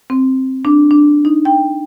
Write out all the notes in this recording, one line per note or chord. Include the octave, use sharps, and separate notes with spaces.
C4
D4
D4
D#4
G5